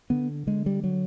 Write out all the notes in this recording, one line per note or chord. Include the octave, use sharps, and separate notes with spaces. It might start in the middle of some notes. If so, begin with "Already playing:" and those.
D3 B3
D3 G#3
G3
F#3